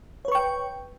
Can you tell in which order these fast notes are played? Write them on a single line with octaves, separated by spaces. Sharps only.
C#5 B4 C#6 G5